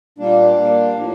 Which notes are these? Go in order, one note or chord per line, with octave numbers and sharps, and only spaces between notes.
A#2 G3 A#3 D4
A#2 G3 A#3
A2 F3 A#3